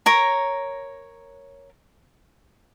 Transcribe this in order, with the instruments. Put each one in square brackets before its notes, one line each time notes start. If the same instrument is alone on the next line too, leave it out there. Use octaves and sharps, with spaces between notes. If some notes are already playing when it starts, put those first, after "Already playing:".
[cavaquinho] A#4 C#5 A#5